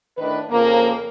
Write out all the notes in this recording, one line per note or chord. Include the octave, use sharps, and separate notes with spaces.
A2 D#3 D4 B4
F2 C#3 F3 A#3